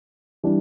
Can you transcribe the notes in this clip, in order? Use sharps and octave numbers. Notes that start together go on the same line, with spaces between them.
E3 G3 D4